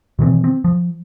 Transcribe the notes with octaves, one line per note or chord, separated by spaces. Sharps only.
B2 D#3 E3 C4
C4
F3